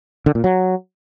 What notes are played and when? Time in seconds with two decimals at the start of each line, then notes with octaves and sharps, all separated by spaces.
0.26 D3
0.35 A#2
0.44 F#3